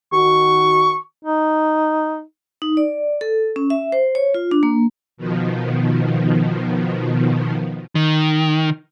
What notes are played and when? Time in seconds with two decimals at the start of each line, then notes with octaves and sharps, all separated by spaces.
0.13 D#3 F#4 C#6
1.24 D#4
2.62 D#4
2.77 D5
3.21 A4
3.56 C#4
3.70 E5
3.92 C5
4.15 C#5
4.34 F4
4.51 D4
4.63 A#3
5.17 B2 D#3 F3
7.95 D#3